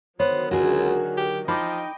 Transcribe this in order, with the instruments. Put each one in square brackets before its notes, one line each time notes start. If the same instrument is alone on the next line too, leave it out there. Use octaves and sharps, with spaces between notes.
[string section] D3 D#3 F#3 [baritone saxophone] B3 [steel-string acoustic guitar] C5 [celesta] C#5
[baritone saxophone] C#2 [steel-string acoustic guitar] F#4 G#4
[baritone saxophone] G4
[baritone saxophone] F3 [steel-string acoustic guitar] D#4 [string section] D#5 G5 [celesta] B5 D6